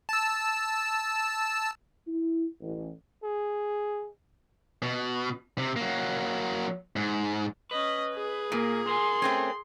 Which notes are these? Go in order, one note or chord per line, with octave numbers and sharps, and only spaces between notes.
A5 E6
E4
A1
G#4
B2
C3
F#3 A#3
G#2
C#4 B4 D#5
G#4
A#2 A#3
A#4 G#5 C6
A3 C4 C#4